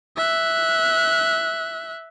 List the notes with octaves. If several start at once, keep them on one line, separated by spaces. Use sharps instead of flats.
E5 F#6